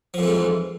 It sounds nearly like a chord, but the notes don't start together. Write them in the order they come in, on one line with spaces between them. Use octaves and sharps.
F3 F2 E3 G#2